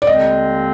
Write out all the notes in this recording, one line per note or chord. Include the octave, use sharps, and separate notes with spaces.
D5
D#2 D3 G#3 C4 D#5